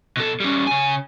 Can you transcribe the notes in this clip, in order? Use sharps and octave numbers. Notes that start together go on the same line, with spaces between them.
B2 A4
G3 C#4
C#3 G#5